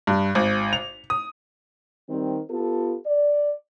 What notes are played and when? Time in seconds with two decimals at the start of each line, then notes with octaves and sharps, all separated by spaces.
0.07 G2
0.35 G#1
0.73 F7
1.10 D#6
2.10 D#3 G3 C4
2.49 B3 F4 G4 A4
3.06 D5